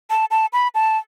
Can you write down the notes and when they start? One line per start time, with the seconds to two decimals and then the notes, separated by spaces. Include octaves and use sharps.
0.10 A5
0.31 A5
0.53 B5
0.75 A5